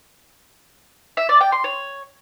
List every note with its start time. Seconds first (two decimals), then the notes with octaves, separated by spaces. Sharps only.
1.17 E5
1.29 D5
1.41 G5
1.52 C6
1.64 C#5